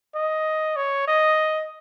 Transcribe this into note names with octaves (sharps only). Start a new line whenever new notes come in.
D#5
C#5
D#5